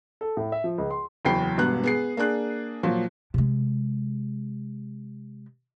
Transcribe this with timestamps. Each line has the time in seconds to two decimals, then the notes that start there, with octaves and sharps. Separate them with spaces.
0.21 A4
0.37 A2
0.52 E5
0.64 F3
0.78 C#2
0.91 C6
1.25 F#1 E2 F#3 G5 B5 C7
1.58 E1 G2 B3 F#6
1.83 B3 G#4 C7
2.17 A#3 D4 G#4 F#6
2.83 A#2 F3 F#3
3.34 C3 G#3